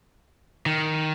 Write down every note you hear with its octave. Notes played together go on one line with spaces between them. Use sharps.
D#3